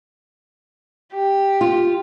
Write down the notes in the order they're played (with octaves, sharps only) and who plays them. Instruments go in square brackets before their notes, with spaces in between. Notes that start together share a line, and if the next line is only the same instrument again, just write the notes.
[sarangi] G4
[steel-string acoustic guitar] F4